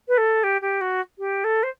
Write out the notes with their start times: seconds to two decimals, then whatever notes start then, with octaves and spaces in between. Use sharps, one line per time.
0.08 B4
0.18 A4
0.44 G4
0.62 G4
0.81 F#4
1.19 G4
1.44 A4
1.63 C5